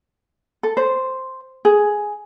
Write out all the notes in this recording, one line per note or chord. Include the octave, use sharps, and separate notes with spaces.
A4
C5
G#4